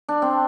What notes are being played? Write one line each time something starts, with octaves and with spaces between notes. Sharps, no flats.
D4
C4